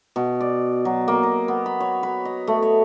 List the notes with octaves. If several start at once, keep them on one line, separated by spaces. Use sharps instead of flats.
B2
D5
F#3
A#3
D#5
B3
B5
C#5
B4
D#5
A3
C#5